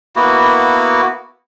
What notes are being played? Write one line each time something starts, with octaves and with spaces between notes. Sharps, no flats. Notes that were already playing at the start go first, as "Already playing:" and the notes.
A#3 B3 E4 F#4